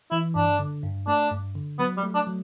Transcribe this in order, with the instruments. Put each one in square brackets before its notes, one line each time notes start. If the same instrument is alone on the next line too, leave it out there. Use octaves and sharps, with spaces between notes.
[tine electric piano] E3 [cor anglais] E4
[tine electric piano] G2 [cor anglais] D4
[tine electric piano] D3
G2
[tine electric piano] A3 [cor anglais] D4
[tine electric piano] G2
D3
[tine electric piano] F#3 [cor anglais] B3
[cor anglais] G3
[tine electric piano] A3
[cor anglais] D4
[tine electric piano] F#3